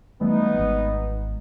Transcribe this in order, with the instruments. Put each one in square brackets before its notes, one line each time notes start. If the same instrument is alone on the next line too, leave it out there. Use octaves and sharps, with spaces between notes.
[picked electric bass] E3 G3 A3 [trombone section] B3 D#4
[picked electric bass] G#1 G#3